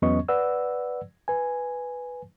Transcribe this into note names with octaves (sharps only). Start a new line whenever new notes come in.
E2 F#3 B3 C#4 D#5 C#6
B4 D5 F#5 E6
B4 G#5